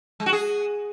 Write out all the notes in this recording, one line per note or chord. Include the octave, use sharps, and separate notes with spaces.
G#3
F#4
G#4